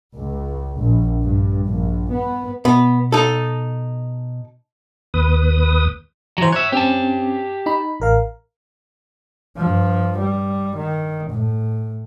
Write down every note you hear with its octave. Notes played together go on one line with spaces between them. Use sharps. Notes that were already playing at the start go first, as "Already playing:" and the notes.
C#2
A#1
G2
A#1
B3
B2 B3
D#4 A4
D#2 B4 D#6
E3 F#3 C5 A#5
C#5 E5 E6 F#6
C4 C#4 G4 A5
D#4 B5
A1 A#4 F5
G2 F3
G3
D#3
A2